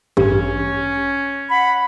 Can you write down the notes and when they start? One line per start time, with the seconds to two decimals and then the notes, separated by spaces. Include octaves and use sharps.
0.17 A1 G2 C#4
1.50 F#5 B5